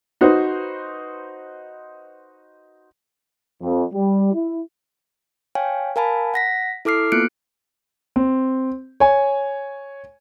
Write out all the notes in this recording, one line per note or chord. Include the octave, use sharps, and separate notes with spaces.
D#4 F#4 B4 C5
F2
G3
E4
C#5 F5 G5 G#5
A#4 F5 G#5 A5 B5
F#5 A#6 B6
E4 A4 D6 F6 C7
A#3 B3 F4 F#6 C#7 D7
C4
C#5 G#5